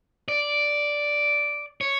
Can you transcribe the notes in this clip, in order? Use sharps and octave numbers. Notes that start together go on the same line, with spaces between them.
D5
C#5